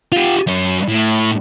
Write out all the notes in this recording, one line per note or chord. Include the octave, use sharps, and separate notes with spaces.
F4 G4
F#2 C#4
A2